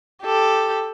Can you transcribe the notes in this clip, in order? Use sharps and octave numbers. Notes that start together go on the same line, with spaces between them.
G4 A4